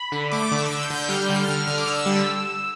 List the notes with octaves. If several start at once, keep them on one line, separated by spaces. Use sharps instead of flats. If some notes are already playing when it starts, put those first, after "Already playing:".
Already playing: B5
D3
A3 D6
D3
E6
D6
D3 E6
G6
D3
G3 F6
G6
D3
F6
D3
D3
D6
D3 E6
G3